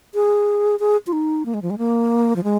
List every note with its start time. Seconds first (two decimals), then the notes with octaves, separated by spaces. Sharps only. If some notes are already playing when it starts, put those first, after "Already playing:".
0.14 G#4
0.80 G#4
1.07 F4
1.13 D#4
1.46 A#3
1.54 G#3
1.62 F3
1.70 G#3
1.78 A#3
2.36 F3
2.44 G#3